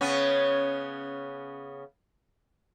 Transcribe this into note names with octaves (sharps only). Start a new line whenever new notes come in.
C#3 B3 C#4